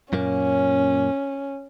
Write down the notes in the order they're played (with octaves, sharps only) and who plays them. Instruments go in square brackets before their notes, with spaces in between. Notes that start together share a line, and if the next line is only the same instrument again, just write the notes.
[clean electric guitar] F#2 A#2 A#3 [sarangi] C#4